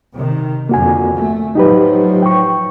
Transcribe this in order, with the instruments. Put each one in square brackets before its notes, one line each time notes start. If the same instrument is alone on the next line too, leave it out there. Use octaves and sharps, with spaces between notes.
[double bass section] C3 D#3
[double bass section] F2 D3 [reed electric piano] A#3 F#4 G#5
[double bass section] A3
[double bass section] A2 F3 F#3 [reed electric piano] D#4 G4 B4
[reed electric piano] G5 C#6